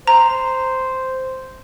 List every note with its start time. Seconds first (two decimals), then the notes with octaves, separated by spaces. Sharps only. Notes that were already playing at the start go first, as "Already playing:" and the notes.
0.07 C5 A#5